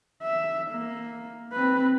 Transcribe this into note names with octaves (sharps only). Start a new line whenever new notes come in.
E5
A#3
C4 B4